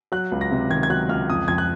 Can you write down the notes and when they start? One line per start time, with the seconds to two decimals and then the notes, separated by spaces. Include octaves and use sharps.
0.12 F#3 F#6
0.32 C#2
0.41 A#6
0.51 C3
0.70 D#3 G#6
0.83 G#6
0.90 F#3 F#6
1.09 C#2 F6
1.30 F2 D#6
1.48 F2 G#6
1.58 F#6